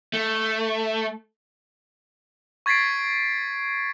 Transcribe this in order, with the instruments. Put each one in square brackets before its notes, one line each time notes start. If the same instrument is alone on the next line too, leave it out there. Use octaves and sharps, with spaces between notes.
[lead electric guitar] A3
[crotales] C#6 G#6 A6 B6 C7 D7